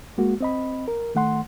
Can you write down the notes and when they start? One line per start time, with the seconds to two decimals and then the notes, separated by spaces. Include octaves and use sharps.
0.18 G#3 A#3 F#4
0.40 C4 D#5 B5
0.88 A#4
1.15 D#3 A3 F#5 C6